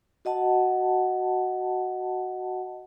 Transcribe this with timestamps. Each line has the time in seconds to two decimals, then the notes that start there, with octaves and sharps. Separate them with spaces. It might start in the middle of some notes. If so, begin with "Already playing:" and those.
0.25 F#4 D#5 F#5 A5